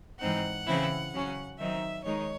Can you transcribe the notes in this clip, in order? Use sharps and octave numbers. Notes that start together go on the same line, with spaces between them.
G#2 E3 C4 D#4 F#5
C#3 E3 C4 E4
C#3 F#3 C#4
D#3 F#3 C4 D#4 E5
D#3 G#3 D#4 C#5